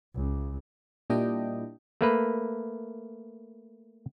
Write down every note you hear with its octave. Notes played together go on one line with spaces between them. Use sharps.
C#2
A#2 G3 D4 E4 D#5 G5
A3 A#3 B4